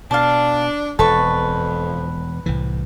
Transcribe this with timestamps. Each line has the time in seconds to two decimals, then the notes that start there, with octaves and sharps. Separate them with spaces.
0.11 B2 D4 F5 A5
0.99 E1 F2 A4 B4 C#6
2.46 C2 A2 E3